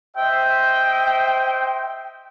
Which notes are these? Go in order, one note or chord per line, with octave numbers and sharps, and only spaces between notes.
C5 D#5 E5 G5